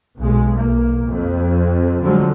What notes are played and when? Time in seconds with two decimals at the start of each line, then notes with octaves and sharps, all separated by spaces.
0.17 B1 B2 G#3
0.56 B1 A#3
1.07 F2
2.02 D3 F3 F#3 G#3